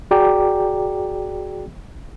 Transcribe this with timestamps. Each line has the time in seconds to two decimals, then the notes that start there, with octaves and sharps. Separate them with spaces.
0.11 F#4 G#4 D5 G5 A#5 D6